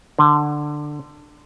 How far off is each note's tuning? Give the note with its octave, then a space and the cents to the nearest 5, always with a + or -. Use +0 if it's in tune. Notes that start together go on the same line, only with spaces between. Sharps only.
D3 +15